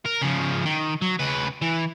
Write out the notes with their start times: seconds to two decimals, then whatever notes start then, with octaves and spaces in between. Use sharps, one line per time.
0.05 A#4
0.21 C#3 F3
0.66 D#3
1.02 F#3
1.19 C#3 B4
1.62 E3